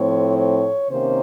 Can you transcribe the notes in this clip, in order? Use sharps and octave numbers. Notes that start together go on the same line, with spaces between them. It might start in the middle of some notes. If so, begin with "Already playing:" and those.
Already playing: A2 F3 A3 C4 C#5
C#5
C3 D#3 A#3 C#4 C5